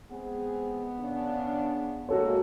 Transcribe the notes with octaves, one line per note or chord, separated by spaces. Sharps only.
G#3 B3 C4 G#4
C#3 D4
G#3 A#3 F#4 A4 C#5